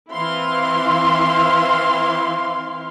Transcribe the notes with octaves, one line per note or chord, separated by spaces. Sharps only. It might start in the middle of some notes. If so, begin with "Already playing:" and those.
E3 C4 E4 F5 C6